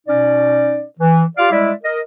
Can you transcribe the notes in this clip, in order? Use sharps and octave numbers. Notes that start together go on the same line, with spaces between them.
B2 C#4 D#4 D5
E3
F4 G4 D5 F5
G3 G#3 E4 D5 E5
A#4 D#5